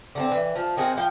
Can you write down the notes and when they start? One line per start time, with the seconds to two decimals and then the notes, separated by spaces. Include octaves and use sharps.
0.15 D3 A3 C4
0.32 E3
0.56 F3
0.77 D#3 C4 G#4 F#5
0.97 F3 F5 G5